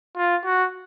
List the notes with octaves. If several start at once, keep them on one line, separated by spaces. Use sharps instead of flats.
F4
F#4